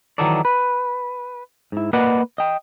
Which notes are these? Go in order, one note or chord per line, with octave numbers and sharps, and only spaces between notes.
D#3 E3 F#3 D#4 A4 D5
B4
G#2 E4
A#3 B4 D5 D#5 F#5
D#5 G5